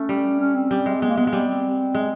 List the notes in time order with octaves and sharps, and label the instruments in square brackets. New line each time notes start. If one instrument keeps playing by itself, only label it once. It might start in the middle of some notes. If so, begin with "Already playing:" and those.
Already playing: [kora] A3 [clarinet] C#4
[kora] G3
[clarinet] C#4
C4
[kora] G3
G#3
[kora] G#3 [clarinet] B3
[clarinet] A#3
[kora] G#3 [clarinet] B3
[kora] G#3
[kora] G3 [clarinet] B3
[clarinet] C4
[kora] G#3